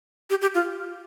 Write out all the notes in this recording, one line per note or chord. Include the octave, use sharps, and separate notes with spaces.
G4
G4
F4